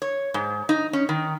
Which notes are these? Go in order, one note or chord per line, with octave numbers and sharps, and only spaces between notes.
C#5
G#2
D#4
C#4
D#3